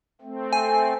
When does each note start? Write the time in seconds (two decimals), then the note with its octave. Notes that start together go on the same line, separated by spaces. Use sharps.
0.21 A3 C4
0.53 G#5